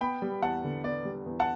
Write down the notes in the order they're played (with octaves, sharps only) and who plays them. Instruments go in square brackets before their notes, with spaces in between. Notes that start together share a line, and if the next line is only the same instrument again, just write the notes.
[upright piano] B3 [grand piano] G5 B5
[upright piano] G3
[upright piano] E2 [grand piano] F#5 A5
[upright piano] D3
[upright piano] B3 [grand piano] D5
[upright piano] G3
E2
[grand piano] F#5 A5